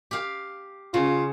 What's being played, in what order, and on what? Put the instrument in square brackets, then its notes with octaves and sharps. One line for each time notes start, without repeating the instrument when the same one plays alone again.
[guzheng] G4 F5
[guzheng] C#3 [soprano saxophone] F4